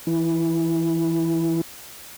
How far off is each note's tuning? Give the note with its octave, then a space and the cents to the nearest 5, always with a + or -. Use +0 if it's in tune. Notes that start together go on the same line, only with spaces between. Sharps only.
E3 +0 E4 +0